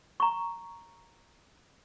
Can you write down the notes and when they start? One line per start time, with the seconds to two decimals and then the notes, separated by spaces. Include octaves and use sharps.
0.20 A#5 C#6